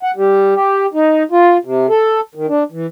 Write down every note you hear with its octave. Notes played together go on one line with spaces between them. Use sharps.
F#5
G3
G4
D#4
F4
C3
A4
D#3
D4
E3